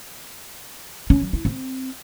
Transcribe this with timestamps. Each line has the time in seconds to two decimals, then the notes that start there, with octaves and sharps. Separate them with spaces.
1.10 C#4
1.22 F#3
1.33 E4
1.45 C4